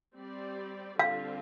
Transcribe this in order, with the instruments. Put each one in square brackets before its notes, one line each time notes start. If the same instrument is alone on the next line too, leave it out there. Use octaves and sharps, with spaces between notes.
[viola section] G3 C4 G4 D5
[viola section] D3 G3 C4 F4 [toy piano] F5